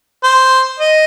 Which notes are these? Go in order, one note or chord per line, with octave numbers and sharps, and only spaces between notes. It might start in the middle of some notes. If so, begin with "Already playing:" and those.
C5
D#5